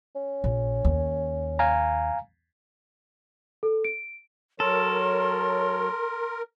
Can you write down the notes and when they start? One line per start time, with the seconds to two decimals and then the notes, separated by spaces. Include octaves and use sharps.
0.15 C#4
0.44 A#1
0.85 D#2
1.59 F5 G#5 A#5
3.63 A4
3.85 D7
4.60 F#3 A4 A#4 C#5 C6